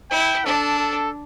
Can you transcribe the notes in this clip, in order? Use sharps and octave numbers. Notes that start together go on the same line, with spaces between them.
E4 G5
D4 A4
A4